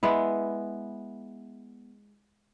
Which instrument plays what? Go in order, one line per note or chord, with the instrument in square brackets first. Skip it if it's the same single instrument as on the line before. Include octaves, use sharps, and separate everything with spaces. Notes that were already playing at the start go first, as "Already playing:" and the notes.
[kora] G#3 B3 E4